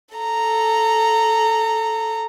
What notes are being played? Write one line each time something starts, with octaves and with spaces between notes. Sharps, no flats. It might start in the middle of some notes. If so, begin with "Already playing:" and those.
A4 A#5